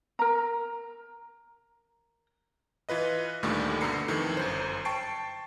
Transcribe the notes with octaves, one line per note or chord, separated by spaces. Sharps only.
A#4 A#5
E3 F4 B4 D#5
D2 G2 A#2 D#3 G3 A3
B2 D3 A4 A#5 C7 C#7
F2 D#3 E3
G1 F#2 C5
G5 A5 C#6 C7 D7